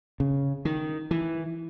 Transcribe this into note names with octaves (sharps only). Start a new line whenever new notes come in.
C#3
D#3
E3